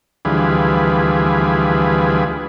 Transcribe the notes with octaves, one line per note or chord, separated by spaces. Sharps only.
D2 E3 F3 G3 G#4 B4